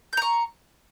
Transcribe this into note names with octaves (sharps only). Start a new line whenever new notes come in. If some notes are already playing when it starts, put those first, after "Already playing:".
A#5 C#6 G6